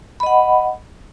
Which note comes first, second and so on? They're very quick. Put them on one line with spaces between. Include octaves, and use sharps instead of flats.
B5 D#5 F#5